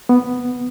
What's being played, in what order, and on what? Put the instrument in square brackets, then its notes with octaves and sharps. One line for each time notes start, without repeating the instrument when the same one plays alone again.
[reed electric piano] B3